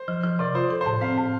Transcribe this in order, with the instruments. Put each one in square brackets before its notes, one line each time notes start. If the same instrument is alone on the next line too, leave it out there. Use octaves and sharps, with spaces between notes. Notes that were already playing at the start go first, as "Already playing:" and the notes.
Already playing: [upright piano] C5
[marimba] F3
F3
[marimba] C3 [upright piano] D5
[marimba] F4 [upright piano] C5
[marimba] A4
[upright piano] C5
[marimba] A2
[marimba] C4 [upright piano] F5
[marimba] A2